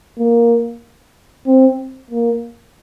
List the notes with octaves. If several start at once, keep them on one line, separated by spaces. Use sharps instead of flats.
A#3
C4
A#3